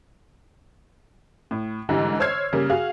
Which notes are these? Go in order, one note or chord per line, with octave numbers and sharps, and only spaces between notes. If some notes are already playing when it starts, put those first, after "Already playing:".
A2
G#2 D3 E3 G3 G#3
C5 C#5 E6 F6 G#6 C7
C#3 G3 A#3
F#4 G#4 F5